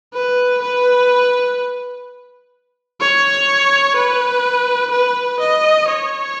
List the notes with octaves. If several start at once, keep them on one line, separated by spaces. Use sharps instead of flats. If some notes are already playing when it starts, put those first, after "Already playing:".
B4
B4
C#5
B4
B4
D#5
C#5